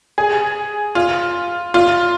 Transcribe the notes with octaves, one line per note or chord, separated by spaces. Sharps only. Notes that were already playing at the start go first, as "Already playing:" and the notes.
G#4
F4
F4